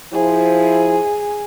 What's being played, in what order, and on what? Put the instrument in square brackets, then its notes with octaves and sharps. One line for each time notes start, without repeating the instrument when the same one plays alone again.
[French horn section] F3 E4 C5 [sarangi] G#4